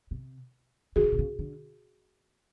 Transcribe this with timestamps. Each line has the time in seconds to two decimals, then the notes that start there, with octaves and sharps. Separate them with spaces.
0.11 C3
0.96 D3 F#4 G#4
1.03 C#3
1.12 C3
1.19 C#3
1.39 D3